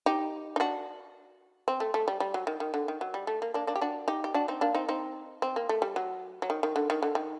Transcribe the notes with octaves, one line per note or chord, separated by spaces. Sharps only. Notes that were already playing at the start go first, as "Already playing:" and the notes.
D#4 G4
D#4
D4 F#4
C4
A3
A3
G3
G3
F#3
D#3
D#3
D3
D#3
F#3
G3
A3
A#3
A#3 D4
A#3 D4
G4
D4 F#4
D#4 G4
G4
D4 F#4
C4 D#4
A#3 D4
C4 D#4
C4 D#4
C4
A#3
A3
G3
F#3
F#3
D#3
D#3
D3
D#3
D3
D#3